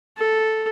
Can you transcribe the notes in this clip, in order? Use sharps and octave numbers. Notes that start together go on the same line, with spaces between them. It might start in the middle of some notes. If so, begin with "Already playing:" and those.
A4